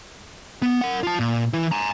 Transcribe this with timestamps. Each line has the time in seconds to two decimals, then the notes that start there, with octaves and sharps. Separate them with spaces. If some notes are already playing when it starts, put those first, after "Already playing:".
0.62 B3
0.81 A#4 F#5
1.03 F4 A5
1.20 A#2
1.53 E3 E4
1.72 G#5 A#5